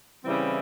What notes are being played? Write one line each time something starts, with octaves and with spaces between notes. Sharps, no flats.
C#3 E3 G3 C4 E4